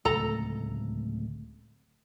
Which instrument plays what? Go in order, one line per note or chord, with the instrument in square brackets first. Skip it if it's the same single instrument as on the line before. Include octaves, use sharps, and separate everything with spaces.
[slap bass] D1 C#2 A3 [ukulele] A4 A#5